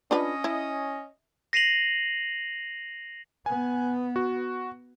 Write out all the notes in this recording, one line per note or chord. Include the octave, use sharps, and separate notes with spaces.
C#4 D4 F4 B4 D#5
E4
A#6 C7 D#7 F7 F#7
B3 G#5
F#4